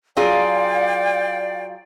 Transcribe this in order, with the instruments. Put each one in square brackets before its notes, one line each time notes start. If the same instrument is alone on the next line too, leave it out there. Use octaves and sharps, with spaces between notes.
[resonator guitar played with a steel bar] F#3 F4 G#4 [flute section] D5 F5 G5